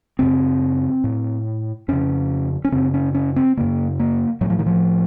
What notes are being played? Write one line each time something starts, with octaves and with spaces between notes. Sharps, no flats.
F#2 C#3 C4
A2
F2 C#3 C#4
C#4
F#2 C#3 C4
C#4
C#4
C4
F#2 C#3 A#3
A#3
A2 F#3
F3
D#3
F3